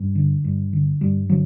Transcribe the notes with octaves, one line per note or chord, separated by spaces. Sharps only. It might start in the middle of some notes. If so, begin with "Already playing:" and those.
Already playing: G2
D3
G2
D3
G2 G3
D3 F#3